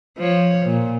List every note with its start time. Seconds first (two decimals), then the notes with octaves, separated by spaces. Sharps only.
0.18 F3 C#5
0.66 A#2